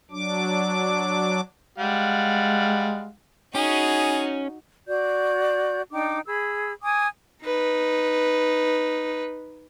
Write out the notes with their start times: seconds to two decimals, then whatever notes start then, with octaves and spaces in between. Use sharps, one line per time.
0.11 F#3 D4 D6
1.78 G3 G#3 F5 F#5
3.55 C#4 D#4 F#4 G#4
4.87 F#4 D5 G6
5.91 D4 D#4 G5 D6
6.27 G#4 B5 E6
6.82 G#5 D6 D#6
7.43 D#4 B4